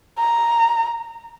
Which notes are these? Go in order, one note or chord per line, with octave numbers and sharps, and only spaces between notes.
A#5